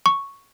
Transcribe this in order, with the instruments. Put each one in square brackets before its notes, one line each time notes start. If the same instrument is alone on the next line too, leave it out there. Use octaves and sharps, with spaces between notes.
[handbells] C#6